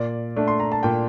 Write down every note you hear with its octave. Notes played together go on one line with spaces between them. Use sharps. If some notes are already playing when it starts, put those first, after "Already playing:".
Already playing: A#2 D5
A3 D4
C6
A#5
A5
A#2 G5